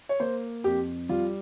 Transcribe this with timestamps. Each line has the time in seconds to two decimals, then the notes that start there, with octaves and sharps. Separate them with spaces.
0.09 C#5
0.20 A#3 C5
0.64 F2 G4
1.09 G3 F4